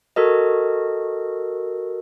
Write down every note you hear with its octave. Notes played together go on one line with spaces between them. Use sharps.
F#4 A4 A#4 D#5